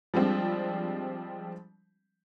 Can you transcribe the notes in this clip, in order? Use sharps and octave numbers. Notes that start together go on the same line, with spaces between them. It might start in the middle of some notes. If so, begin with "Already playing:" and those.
F3 G3 G#3 C4 D4